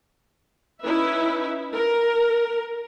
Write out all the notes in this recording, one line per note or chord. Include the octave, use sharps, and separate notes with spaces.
C#4 D#4 E4 B4 E5
A#4